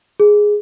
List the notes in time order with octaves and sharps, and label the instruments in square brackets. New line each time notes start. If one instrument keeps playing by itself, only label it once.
[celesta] G#4